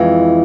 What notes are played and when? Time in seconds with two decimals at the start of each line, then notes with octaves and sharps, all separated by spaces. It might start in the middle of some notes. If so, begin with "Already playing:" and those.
Already playing: F2 E3 G#3